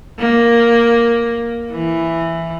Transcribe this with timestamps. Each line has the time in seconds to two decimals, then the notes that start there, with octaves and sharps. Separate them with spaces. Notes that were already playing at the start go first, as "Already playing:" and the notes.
0.19 A#3
1.71 E3